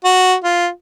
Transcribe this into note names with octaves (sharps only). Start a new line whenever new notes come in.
F#4
F4